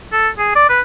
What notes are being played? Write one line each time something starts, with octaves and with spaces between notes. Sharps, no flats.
A4
G#4
D5
B4